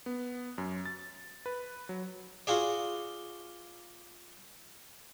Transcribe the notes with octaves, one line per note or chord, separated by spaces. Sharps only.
B3
F#2
A6
B4
F#3
F4 F#4 G#4 D5